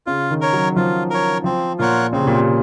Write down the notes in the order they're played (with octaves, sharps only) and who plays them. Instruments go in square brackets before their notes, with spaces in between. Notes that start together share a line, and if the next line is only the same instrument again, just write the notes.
[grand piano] C#3 [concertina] F4
[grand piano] D#3
[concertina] A#4 C#5
[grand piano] F#3
[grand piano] F3 [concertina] F4
[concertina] A#4 C#5
[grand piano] F3 [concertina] C4
[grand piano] A#2 [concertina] F4 A#4 C#5 F#5
[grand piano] C#3 [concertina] C4
[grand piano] C3
A#2
C3